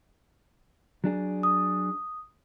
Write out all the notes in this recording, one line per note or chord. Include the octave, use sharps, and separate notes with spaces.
F#3 D4 G#4
D#6